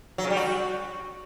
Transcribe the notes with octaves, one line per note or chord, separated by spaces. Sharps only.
F#3
C#3
G3
F#4